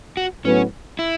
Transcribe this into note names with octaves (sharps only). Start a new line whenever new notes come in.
F#4
A2 F#3 B3 C#4
E4